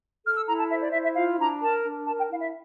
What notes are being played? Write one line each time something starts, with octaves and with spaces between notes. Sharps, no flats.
A4 F6
E6
E4 A#5
A5
C5 E5
D5
E4 E5
E5
F4 F5
D4 A#5
A#4 A5
D4
A#4 A5
G5
E4 F5
E5